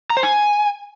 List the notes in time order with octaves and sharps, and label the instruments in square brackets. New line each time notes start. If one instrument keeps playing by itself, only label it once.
[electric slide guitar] A#5
C5
G#5